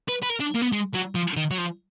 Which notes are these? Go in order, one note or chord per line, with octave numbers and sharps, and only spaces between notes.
B4
B4
A#4
D4
A#3
B3
G#3
F#3
F3
D#3
F#3
F3